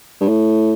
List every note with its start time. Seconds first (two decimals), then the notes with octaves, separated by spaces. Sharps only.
0.21 G2
0.28 A2